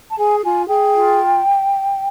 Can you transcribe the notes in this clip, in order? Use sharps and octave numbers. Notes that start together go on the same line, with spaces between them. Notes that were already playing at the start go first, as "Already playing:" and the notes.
A5
G#4 G#5
F4 G#5
G#4 G5
F4